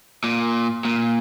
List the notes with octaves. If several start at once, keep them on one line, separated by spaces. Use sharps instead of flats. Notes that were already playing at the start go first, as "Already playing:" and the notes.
A#2
A#2